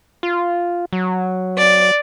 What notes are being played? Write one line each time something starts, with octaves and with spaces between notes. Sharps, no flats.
F4
F#3
D5